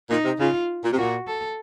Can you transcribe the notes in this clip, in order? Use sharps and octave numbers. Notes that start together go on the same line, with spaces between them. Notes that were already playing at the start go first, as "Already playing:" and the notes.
A#2 D#4
C3
C#3 F4
A#2
C3
A#2 F#4
A4